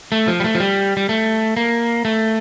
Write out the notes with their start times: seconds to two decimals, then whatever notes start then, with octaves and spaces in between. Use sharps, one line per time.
0.12 A3
0.28 F3
0.40 G3
0.44 A3
0.55 F3
0.60 G3
0.97 G3
1.09 A3
1.57 A#3
2.05 A3